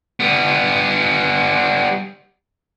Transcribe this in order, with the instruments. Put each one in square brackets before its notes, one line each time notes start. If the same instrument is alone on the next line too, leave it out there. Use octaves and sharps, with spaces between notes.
[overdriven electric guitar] G3 B3